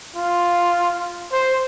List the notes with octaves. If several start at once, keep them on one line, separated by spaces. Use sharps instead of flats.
F4
C5